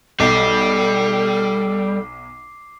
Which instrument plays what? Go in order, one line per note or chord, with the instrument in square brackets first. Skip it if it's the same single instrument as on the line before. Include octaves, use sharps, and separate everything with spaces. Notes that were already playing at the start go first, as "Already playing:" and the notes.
[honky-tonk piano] B1 [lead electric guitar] G3 [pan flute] A4 [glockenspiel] D6 C7